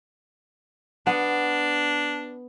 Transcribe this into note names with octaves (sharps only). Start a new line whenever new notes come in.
B3 D4